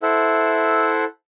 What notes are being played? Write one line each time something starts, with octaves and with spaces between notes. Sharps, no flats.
E4 A4 C5 E5 F#5